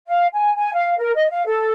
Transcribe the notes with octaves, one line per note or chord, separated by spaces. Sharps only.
F5
G#5
G#5
F5
A#4
D#5
F5
A4